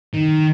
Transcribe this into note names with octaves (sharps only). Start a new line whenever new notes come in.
D#3